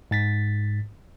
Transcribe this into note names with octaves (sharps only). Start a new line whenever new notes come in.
G#2 A6 B6